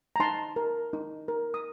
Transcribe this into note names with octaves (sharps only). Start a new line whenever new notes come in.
A#5
D#4 A5 C6
A#4
D#4
A#4
D#6